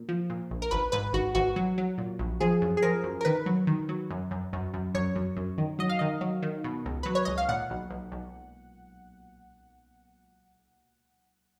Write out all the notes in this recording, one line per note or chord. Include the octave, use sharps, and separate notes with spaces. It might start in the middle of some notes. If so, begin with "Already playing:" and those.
Already playing: A#2
F3
A#2
A#1
A#4
G#1 B4
G#2 B4
G#1 F#4
G#1 F#4
F#3
F#3
A#2
A#1
F3 G#4
F#2
G#4
F3 A#4
F#2
A#4
D#3 B4
F#3
D#3
F#3
F#2
F#2
F#2
F#2
F#2 C#5
F#2
F#2
D#3
F#3 D#5
F5
D#3 D#5
F#3
D#3
B2
C#2
F#3 B4
C#5
C#2 D#5
F5
A#2 F#5
B1
B1
B1